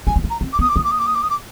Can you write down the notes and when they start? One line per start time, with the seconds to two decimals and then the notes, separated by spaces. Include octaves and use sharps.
0.07 G#3 G#5
0.16 A#3
0.24 A3
0.30 A#5
0.41 C4
0.53 D6
0.59 B3 D#6
0.68 D6
0.76 A#3 D#6
0.84 D6
0.91 D#6
0.99 D6
1.06 D#6
1.14 D6
1.22 D#6
1.30 D6